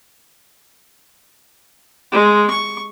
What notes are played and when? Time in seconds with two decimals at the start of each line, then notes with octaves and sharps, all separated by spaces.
2.12 G#3
2.49 C#6